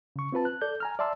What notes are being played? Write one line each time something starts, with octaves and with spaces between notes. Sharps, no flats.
C#3 C#6
C4 F4 B4 A5
F#6
A4 D5 G6
G#5 A#5 F6
D5 E5 A5 C6 E6